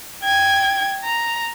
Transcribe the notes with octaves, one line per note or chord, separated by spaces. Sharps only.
G5 G#6
A#5